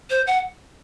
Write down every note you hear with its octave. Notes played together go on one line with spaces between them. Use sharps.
C5
F#5